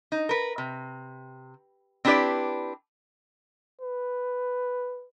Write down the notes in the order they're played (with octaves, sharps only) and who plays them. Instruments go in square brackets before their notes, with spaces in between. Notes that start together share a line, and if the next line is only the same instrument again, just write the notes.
[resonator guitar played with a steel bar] D#4
A#4 B4
C3
C4 D4 E4 G4 B4 D5
[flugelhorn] B4